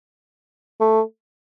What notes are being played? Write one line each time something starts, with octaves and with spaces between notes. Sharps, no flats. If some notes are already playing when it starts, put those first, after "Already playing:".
A3